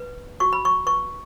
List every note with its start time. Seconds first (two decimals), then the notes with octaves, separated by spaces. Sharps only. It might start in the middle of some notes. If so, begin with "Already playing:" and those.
Already playing: B4
0.40 F#4 C#6
0.53 B5
0.65 C#6
0.86 B4 C#6